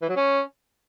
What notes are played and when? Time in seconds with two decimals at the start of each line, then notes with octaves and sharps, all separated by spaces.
0.02 E3
0.09 F#3
0.16 C#4